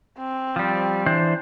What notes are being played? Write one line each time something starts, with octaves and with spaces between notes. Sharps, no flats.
C4
F3 G3
E3 D4 C5